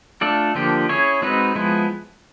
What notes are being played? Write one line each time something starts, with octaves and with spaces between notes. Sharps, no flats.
A3 D4 F4 A4 D5
D3 F3 A#3 D4 G4
C#4 E4 G#4 C#5
G#3 C4 D#4 F#4 B4
F3 G#3 B3 E4